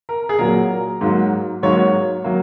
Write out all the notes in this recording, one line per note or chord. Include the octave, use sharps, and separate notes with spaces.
A#4
G#4
A#2 F#3 A#3 A#4
G#2 F#3 A#3
G#2 F#3 A#3 C#5
F#3 A#3